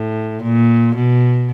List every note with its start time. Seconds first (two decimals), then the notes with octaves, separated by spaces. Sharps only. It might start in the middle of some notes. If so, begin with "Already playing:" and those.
Already playing: A2
0.43 A#2
0.95 B2